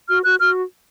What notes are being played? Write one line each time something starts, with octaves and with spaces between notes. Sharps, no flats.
F#4 F6
F#4 F#6
F#4 F6